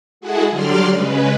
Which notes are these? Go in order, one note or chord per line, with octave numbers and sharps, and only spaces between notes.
G#3 E4 F#4 G#4 A4 F#5
D3 F#3 G3 D5 C6 F6
C#3 G#3 B4